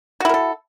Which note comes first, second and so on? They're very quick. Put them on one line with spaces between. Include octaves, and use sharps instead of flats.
F#4 E4 A#4 A4